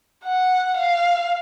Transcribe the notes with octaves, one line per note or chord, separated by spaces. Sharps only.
F#5
F5